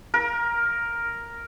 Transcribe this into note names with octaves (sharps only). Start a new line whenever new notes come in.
A#4